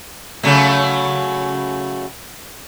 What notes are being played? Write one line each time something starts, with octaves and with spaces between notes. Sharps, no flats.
C#3 F#3 A3